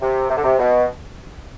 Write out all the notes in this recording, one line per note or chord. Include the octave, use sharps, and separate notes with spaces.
C3
C3
D3
C3
B2